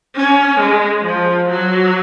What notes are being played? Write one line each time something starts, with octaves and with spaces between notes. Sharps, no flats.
C#4
G#3
F3
F#3